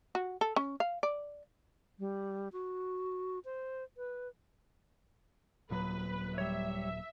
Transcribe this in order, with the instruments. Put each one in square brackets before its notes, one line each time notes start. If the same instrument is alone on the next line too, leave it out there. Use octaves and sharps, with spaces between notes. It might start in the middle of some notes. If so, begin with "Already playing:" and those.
[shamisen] F#4
A4
C#4
F5
D5
[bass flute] G3
F#4
C5
B4
[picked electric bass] D#1 A#2 F#3 [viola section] B4
[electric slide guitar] G3 C#5 [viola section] E5